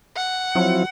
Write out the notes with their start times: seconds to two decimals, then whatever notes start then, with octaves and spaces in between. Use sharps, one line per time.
0.16 F#5
0.55 F3 F#3 C4 E4